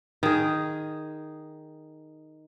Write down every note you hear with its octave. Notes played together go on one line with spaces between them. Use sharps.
D#3 G#4